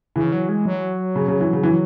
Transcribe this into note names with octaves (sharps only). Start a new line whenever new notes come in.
C#3 E3
F#3
G#3
F#3
C#3
C#3
E3
C#3
E3